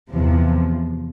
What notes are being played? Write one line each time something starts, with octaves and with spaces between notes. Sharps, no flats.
E2 C3 F3